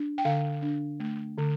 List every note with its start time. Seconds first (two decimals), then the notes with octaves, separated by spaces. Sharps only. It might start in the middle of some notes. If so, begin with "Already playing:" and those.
Already playing: D4
0.18 G5
0.25 D3 F5
0.62 D4
1.00 A3
1.38 D3